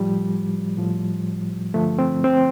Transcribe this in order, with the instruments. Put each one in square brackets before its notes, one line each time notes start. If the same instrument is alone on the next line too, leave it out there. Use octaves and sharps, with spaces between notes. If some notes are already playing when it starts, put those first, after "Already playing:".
Already playing: [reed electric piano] A2 F3 G3
A2 F3
G2 D3 F3 A3
C4
C4